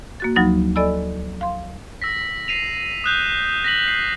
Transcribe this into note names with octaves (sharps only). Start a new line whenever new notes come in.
A#3 F#4 A6
D2 F3 F#3 D#4 B5 A6
A4 D5 D#5 G#5 B5 E6
F5 C6
E6 A#6 B6
C7 D#7 F7
D#6 F#6 G6
A#6 B6 F#7
C7